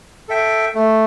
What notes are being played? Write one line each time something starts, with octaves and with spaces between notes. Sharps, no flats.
A4 E5 G5
A3